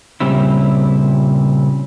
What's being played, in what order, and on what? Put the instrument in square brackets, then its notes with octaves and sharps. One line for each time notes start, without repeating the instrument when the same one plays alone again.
[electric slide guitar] A#2 C#3 G3 C4 E4